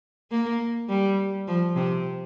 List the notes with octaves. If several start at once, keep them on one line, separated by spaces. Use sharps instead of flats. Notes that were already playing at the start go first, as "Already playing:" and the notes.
A#3
G3
F3
C3